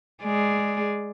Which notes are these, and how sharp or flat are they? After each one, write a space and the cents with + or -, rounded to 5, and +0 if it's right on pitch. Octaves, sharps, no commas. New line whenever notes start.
G#3 +0 G#4 +0 D5 +0